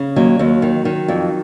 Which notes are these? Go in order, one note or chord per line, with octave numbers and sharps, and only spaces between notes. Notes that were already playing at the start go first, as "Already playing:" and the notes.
Already playing: C#3
D#2 F#3
D#2 F#3
D#3
D#3
F2